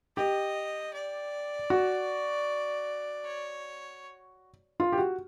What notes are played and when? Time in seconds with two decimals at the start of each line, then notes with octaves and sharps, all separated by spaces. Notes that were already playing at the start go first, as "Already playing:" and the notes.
0.16 G4 D#5
0.94 D5
1.70 F#4
3.25 C#5
4.80 F4
4.92 G4
4.98 F#4